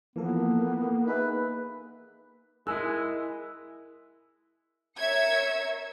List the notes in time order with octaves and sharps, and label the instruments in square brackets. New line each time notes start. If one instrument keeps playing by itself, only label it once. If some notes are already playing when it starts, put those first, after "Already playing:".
[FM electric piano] E3 F3 A4 [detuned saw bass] A#3 [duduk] B3
[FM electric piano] D#4 G#4 E5 [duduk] B4
[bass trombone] G#3 [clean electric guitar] E4 G#4 [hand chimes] A#4 F#6 [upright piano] E6
[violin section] A#4 C#5 E5 E6 G#6 C#7